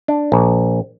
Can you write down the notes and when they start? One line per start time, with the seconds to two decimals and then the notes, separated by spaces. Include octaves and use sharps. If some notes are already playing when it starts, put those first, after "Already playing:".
0.08 D4
0.32 A#1